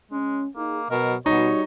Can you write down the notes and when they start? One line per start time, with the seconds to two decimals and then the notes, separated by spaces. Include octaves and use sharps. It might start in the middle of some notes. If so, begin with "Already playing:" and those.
0.11 G#3 C#4
0.56 A#3 D#4 G#4
0.90 B2 F#3 A#4 D#5
1.26 B2 G3 D#4 F#4 C#5